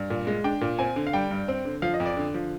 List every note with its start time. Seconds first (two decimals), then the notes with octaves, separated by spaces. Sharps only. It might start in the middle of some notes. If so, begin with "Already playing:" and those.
Already playing: G2
0.10 A#2
0.27 G#3
0.44 D4 G5
0.61 A#2
0.79 C4 G#5
0.96 D3
1.07 F5
1.13 G3 G5
1.31 G2
1.48 C4
1.65 D3
1.82 F3 F5
1.94 D#5
2.00 F2
2.06 D5
2.17 D3
2.34 F3